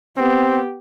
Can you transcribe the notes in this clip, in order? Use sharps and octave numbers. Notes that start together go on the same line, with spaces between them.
B3 C4 G4